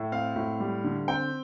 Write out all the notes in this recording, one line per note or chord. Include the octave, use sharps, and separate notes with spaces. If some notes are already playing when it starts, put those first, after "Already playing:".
Already playing: A2
C4 F5
A2
G3
D3
C4 G5